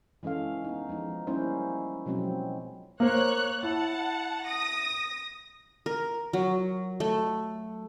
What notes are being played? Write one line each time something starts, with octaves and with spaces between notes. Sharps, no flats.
E3 G#3 C#4 A4 F5
B3 D#4
F3 G#3 D#4
G3 A#3 C#4 D#4 E4 C5
B2 F3 F#3 G#3 C4 C#4
A#3 C5 C#5 F#6
E4 F#5 A5
D#6 A#6
A#4
F#3
A3